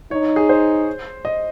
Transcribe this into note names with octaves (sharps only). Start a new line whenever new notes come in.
D#4 C#5
G#4
C5
D#5